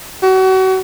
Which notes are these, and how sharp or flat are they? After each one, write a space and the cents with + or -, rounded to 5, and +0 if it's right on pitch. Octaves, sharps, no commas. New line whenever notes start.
F#4 +35